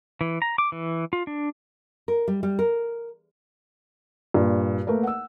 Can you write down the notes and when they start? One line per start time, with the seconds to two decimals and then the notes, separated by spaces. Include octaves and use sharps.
0.21 E3
0.42 A#5
0.58 D6
0.72 E3
1.13 F4
1.27 D4
2.08 A#4
2.28 G3
2.43 G3
2.59 A#4
4.34 G2 A#2
4.87 A3 A#3 A#4 B4
5.03 F#5 E6